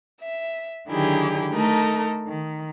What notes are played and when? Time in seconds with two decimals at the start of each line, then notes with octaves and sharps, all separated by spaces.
0.23 E5
0.89 D3 D#3 F#3 E4 G4 G#4
1.53 A3 D#4 A4 A#4
2.27 D#3